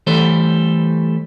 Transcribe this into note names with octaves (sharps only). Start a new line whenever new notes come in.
E3 G3 A3 A4 C5